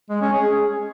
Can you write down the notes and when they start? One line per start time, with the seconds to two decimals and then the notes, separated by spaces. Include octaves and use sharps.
0.10 G#3
0.22 C#4
0.33 G#4